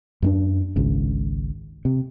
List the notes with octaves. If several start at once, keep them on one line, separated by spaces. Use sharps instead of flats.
F#2 B3 D4
G#1 C#2 C#3
C3